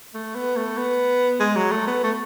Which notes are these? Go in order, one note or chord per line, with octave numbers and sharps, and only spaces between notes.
A3
B3
A3
B3
G#3
F#3
A3
B3
A3